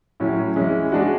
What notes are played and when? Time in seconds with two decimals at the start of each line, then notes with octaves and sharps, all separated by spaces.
0.20 A2 F#3 C#4 E4
0.56 E3 G#3 C#4 E4
0.92 G#3 D4 F#4